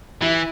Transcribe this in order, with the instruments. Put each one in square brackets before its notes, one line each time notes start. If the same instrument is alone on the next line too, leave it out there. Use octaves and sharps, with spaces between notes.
[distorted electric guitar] E3 [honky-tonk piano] E4